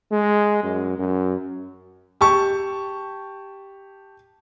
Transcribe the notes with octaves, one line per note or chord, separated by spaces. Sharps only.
G#3
F#2
F#2
G4 A5 C#6